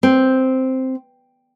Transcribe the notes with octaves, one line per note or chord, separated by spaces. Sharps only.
C4